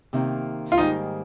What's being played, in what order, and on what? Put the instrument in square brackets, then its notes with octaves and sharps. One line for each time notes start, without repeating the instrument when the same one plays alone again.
[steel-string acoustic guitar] C3 D#3 A#3
[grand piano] F4
[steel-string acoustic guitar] G#2 D#3 G3 A#3 [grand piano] D#4